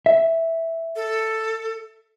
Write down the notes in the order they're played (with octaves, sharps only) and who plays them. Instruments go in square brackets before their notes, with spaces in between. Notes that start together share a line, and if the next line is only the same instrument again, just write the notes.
[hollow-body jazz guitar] E5
[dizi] A4